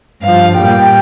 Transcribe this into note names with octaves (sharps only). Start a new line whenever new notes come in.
G2 F3 F5
A#2 G3 G5